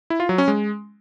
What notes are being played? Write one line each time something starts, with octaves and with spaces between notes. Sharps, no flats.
E4
F4
F#3
C#4
G#3